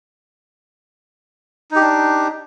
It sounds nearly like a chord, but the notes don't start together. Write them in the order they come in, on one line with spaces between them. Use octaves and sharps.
D#4 G4 D4